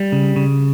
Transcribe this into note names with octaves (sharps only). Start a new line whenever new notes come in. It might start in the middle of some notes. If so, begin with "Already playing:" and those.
Already playing: G3
C#3
C#3